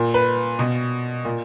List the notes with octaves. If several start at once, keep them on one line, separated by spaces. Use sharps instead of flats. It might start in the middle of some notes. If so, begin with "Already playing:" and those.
Already playing: A#2
B4
B2
A#2